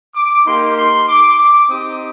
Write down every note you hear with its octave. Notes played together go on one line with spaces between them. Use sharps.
D6
A#3 D#4 G4 C6
C6
D6
D6
C4 D#4 G4 D#6